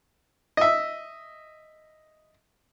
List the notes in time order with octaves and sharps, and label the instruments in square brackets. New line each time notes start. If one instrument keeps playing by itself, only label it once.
[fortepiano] D#5 E5